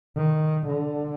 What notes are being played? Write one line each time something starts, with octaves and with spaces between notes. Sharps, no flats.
D#3
D3